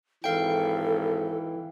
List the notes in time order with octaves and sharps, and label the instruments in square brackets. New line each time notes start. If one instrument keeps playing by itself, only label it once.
[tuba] G#1 [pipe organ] E3 [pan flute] A4 [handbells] F5 G5